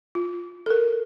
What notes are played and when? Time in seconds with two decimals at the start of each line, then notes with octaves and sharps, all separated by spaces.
0.15 F4
0.66 A4 A#4